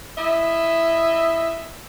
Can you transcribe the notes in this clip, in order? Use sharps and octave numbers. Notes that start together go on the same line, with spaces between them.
E4 D#5 E5